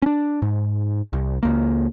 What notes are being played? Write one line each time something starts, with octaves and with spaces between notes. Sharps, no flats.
C#4 D4
G#2
C2
C#2 A#3